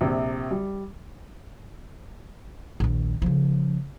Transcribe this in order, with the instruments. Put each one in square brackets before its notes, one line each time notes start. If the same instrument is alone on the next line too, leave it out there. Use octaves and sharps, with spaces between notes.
[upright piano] A#1 C3
G3
[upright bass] A#1 D#2
C#3 F3